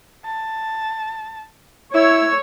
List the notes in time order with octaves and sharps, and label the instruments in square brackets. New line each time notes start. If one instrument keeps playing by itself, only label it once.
[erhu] A5
[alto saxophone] E4 [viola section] C#5 [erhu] E6